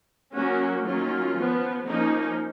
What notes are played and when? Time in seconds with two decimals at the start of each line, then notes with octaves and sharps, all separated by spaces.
0.34 F#3 A#3 C#4 F#4
0.86 D#3 F#3 A#3 C#4 F4
1.36 F3 B3
1.88 F3 A#3 C#4 D#4